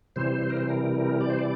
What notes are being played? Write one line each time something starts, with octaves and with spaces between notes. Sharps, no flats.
C3 E3 G3 C5
C5
A#4
C5
A#4
A#4
D5
C5
D5